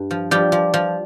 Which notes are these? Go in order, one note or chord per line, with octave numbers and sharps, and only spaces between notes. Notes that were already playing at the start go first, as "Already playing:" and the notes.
Already playing: G2
F3
F3 G3 G4
F3
F3